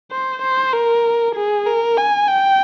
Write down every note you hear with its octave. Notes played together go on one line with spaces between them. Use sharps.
C5
C5
A#4
G#4
A#4
G#5
G5